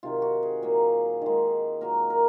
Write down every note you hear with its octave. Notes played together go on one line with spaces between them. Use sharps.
C3 D#3 F#3 F4
F#4
G#4
A#2 F#3 A#3
D#3 G#3
A#2 F#3 A#3 A#4
A#4